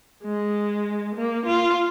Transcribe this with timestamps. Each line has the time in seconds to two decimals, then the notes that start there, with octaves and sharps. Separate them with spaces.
0.23 G#3
1.15 A#3
1.46 F4